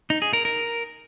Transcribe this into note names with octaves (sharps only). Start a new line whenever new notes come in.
D#4
G#4
A#4
A#4